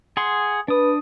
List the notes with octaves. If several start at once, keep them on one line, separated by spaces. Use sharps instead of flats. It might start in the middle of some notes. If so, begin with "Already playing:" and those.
G#4 F#5 C6
D4 B4 D#6